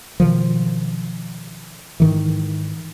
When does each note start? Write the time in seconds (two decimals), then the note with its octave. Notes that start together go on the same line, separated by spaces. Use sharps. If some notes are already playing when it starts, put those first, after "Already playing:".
0.20 B2 D#3 F3
2.00 G#2 D#3 E3